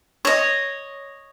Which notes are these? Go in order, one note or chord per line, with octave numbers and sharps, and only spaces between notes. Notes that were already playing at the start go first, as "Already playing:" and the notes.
C#5 D#5